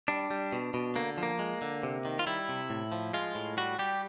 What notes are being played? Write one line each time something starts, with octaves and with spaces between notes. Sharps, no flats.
G3 D4
G3
B2
B2
D3 A#3
F3
A#3
G#3
D3
C3
D#3
F4
G3 E4
C3
A2
F3
G#3 F4
A2
G3 F#4
G3 G4